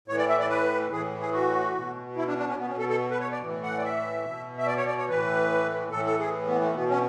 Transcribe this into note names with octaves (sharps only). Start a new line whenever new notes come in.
A2 E3 C#5
D5
E5
D5
B4
A2 E3 G#4
G#4
F#4
B2
E4
D4
D4
C#4
B2 B3
C#4
A4
A4
B4
C#5
D5
A2 E3
F#5
D5
E5
B2
E5
D5
C#5
D5
C#5
A2 E3 B4
A2 E3 A4
A4
G#4
B3
A3
B2 B3
C#4